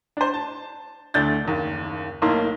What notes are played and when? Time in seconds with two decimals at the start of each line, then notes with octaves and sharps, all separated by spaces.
0.17 D4 C5
0.34 A5
1.14 D2 A3 D4 G6 A6
1.45 F#1 D#2
2.22 B1 A2 A#3 D#4 C6